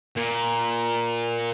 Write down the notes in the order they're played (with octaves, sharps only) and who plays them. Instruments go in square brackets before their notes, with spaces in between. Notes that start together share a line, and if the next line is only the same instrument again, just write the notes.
[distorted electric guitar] A#2